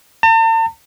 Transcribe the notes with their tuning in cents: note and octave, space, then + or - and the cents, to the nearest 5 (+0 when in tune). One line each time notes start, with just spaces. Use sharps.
A5 +45